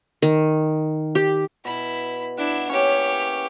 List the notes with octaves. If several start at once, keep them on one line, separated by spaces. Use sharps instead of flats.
D#3
G4
B2 E4 B5
D4 E4 F#5
E3 A#3 C#4 G4 C#5